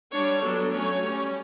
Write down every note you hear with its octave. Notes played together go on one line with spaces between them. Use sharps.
G3 D4 C#5
F#3 B3 D4 A4
F#3 A3 C#4 C#5
G3 C#4